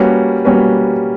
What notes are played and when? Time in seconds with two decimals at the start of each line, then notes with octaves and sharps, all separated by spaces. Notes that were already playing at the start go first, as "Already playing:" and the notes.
Already playing: G3 A#3 C#4 F#4 B4
0.45 G3 A#3 C#4 F#4 B4